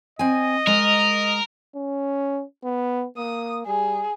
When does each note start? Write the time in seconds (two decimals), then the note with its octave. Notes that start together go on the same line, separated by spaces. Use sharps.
0.19 C4 D#5 G#5
0.67 G#3 A#4
1.75 C#4
2.64 B3
3.17 A#3 D#6
3.66 G3 G#4